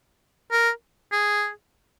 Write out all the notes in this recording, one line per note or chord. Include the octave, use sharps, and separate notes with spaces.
A#4
G#4